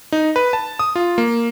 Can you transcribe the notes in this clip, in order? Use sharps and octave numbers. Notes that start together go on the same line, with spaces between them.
D#4
B4
A5
D#6
F4
A#3